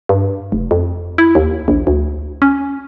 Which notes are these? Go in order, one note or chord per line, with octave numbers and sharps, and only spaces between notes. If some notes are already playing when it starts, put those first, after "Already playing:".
G2
F1
F2
E4
D#2
A#1
D2
C#4